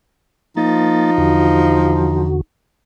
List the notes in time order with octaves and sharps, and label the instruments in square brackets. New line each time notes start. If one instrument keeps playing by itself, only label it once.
[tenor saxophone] F3 [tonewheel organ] A#3 A6 [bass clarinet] D#4
[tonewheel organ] E2 D3 F#4